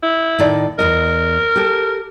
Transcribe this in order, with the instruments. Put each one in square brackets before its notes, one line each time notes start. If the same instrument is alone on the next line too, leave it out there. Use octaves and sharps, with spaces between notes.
[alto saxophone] E4
[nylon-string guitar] A2 D#3 D5
[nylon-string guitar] E2 C3 D#5 [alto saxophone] A#4
[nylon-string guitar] G4 A4